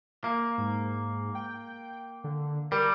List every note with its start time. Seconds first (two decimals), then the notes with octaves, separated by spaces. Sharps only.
0.24 A#3
0.58 G#2
1.35 G5
2.24 D3
2.72 G3 A#4